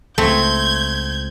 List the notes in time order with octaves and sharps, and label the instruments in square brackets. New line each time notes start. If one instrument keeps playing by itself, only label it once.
[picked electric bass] C#2 [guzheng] A3 [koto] C4 [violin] G6 G#6